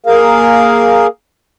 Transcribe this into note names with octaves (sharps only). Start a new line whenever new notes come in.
A#3 G#4 A#4 F5